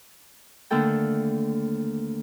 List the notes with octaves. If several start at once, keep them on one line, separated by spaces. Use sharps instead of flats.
D#2 D3 A3 A#3 A4 G5